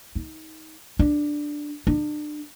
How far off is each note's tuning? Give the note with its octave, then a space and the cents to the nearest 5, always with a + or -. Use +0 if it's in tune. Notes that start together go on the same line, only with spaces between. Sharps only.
D#4 +25
D4 +5
D4 +35